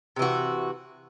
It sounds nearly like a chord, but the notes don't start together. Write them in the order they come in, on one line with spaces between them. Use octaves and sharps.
C3 E3 F#4